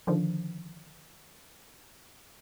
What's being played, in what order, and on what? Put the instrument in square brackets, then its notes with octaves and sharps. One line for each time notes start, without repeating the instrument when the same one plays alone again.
[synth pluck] D3 D#3 F3